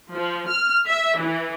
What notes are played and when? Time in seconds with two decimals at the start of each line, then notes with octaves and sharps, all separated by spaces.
0.12 F3
0.50 F6
0.88 E5
1.21 E3